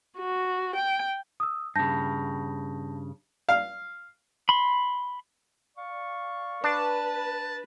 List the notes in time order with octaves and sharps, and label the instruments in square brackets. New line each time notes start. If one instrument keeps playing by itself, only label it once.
[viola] F#4
G5
[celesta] D#6 E6
[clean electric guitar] G2 C#3 [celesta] A5 G6 A#6
[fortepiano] F5
[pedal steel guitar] B5 C6
[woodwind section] D5 F5 C#6
[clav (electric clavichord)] D4 [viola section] B4 [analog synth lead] A5